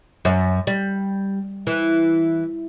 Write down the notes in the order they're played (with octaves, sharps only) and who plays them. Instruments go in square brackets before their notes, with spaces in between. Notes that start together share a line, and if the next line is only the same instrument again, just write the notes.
[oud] F#2
G3
E3